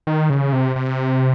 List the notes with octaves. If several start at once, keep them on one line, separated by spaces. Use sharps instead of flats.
D#3
C#3
C3
C3